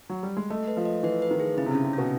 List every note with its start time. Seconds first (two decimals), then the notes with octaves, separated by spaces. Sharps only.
0.09 F#3
0.23 G3
0.37 G#3
0.50 A3 D#5
0.68 B4
0.77 F3
0.85 D#5
1.03 E3 B4
1.22 B4
1.31 D#3
1.40 G#4
1.57 C#3 E4
1.66 C3
1.71 C#3 C#4
1.84 C3
1.93 B2 C#4